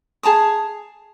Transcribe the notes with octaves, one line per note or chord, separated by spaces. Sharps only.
G#4 A5 A#5 D#6